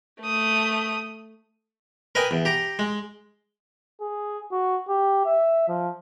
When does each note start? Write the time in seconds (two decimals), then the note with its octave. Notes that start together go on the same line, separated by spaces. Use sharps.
0.21 A3 D#6
2.15 A#4 B4 D#5 G5 G#5
2.31 E2
2.45 G4 A#5
2.79 G#3
4.01 G#4
4.52 F#4
4.89 G4
5.26 E5
5.68 F3